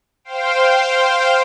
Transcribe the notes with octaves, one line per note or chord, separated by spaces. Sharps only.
C5 F5 G5